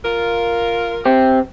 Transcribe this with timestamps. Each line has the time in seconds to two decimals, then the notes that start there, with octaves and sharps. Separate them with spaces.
0.05 F4 A#4
1.05 C4 G4